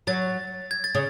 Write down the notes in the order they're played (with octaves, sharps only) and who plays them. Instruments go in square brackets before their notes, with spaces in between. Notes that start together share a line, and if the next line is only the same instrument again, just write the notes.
[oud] F#3 [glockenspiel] A6
[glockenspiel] G#6
A6
[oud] C#3